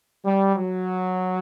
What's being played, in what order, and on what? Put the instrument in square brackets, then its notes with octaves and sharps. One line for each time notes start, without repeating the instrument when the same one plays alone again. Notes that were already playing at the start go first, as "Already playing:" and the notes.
[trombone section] G3
F#3